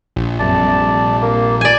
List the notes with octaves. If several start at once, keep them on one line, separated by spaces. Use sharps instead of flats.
A#1
F#2 C3 D5 A5
C3 G3 A4
A#3
D5 G#5